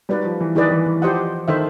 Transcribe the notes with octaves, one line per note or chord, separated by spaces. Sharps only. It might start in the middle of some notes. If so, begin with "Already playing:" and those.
G3 D#4 F#4 B4 D5
F3
E3
D#3 E4 G#4 B4 D5
E3
E3
F3 G4 C5 D#5 F#5
D#3 A4 C5 E5